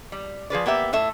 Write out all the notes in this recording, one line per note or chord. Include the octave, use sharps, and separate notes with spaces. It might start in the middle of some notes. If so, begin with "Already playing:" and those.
G3
F3 G#4 B4 D5
A#3 B3 G4 E5
A2 A3 E5